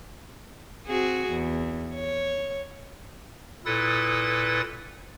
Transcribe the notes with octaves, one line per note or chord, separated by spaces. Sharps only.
C4 F#4 G#4
E2
C#5
A#2 E4 A4 B4 D#6 A6